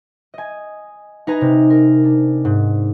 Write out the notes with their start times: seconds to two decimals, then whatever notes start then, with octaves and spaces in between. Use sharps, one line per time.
0.34 D#5 G#5
1.27 D#4 B4 G#5 A#5
1.41 C3
1.70 A#4
2.04 D4
2.45 G#2